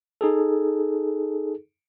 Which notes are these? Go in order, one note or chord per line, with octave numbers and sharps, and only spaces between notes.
D#4 G#4 A4